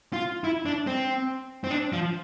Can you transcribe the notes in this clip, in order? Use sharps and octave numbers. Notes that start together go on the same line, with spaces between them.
F4
E4
D4
C4
C4
D4
F3